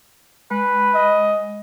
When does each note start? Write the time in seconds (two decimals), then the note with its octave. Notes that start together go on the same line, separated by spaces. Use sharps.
0.51 G#3 B4
0.94 D#5